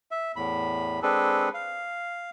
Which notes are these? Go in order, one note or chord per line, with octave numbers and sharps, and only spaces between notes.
E5
E2 A2 B5
G#3 C4 D4 G#4 A4 B4
F5